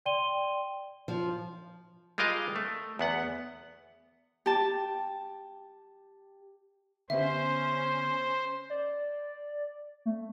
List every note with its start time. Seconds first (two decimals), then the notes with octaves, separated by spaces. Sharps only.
0.06 D5 G5 C6 D#7 G7
1.08 F3
2.18 G3 G#3 F4 A#4 D#5 F5
2.56 A3
2.99 E2 B3 F#5
4.46 G4 A5
7.10 D3 B3 C#4 G4 C5 E5
8.70 D5
10.06 A3